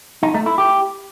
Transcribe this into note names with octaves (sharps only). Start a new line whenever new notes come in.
D#4
A3
E4
G4